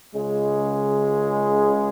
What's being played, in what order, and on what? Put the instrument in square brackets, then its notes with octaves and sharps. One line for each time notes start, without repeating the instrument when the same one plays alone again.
[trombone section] C#2 C#3 G#3